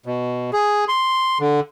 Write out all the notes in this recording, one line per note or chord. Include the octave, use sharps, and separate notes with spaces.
B2
G#4
C6
D3